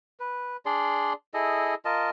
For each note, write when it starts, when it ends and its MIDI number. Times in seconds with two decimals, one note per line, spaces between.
0.20 0.57 71
0.66 1.13 62
0.66 1.13 68
0.66 1.13 74
0.66 1.13 84
1.34 1.74 64
1.34 1.74 68
1.34 1.74 69
1.34 1.74 75
1.85 2.10 65
1.85 2.10 70
1.85 2.10 75
1.85 2.10 81